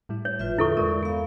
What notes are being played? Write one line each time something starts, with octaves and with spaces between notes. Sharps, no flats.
A2 G3 E4
C#5
G1 A2 F3 F4 B4 E5
E2 G2 D3 E4 A4 C#6
E2 G2 G#3 A#4 D5
B3 F5